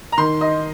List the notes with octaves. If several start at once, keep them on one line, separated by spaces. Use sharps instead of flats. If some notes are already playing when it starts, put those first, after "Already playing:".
A#5
D#3 C6
D#5